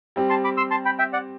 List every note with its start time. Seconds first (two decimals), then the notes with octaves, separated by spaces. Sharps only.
0.16 G3 C4 G4
0.29 A5 C6
0.44 B5 D6
0.57 C6 E6
0.71 A5 C6
0.85 G5 B5
0.99 E5 G5
1.13 D5 F#5